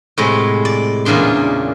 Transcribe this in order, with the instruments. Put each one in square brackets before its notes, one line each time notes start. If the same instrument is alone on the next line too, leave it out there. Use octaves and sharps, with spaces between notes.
[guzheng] A2 C3 G#3
D5
E2 A#2 C#3 D4 C6